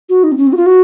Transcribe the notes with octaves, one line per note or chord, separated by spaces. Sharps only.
F#4
D#4
C4
C#4
C4
F#4
F4
F#4